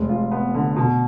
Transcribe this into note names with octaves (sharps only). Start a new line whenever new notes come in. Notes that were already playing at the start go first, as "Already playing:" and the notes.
Already playing: F1 G#3
F4
B3
D3
B2